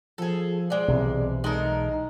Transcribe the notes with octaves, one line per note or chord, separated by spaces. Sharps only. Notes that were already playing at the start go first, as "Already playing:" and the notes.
F3 G#4 A4
G#3 D5
B1 C3 E3
G#3 D#4 A4 A#4